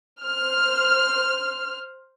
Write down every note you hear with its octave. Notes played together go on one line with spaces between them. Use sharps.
C5 F6